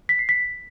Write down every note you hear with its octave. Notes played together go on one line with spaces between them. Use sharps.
B6
C7
B6